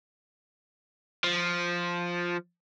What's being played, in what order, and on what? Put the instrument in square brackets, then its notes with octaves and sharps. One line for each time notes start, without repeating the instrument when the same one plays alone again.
[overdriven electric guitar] F3